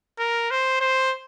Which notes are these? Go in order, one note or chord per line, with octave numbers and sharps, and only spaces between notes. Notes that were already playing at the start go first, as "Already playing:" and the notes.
A#4
C5
C5